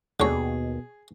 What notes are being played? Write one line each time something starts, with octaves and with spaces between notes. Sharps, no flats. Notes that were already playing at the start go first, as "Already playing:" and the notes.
D#2 B2 D3 G#4 C#5